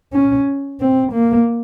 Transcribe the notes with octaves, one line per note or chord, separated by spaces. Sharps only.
C#4
C4
A#3